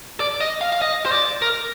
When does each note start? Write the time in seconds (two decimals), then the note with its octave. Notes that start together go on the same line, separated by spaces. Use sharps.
0.20 D5
0.41 D#5
0.61 F5
0.72 F5
0.82 D#5
1.06 C5
1.12 D5
1.42 A#4